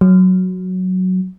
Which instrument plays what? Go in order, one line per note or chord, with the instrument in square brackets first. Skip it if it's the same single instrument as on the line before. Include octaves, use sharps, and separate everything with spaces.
[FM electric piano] F#3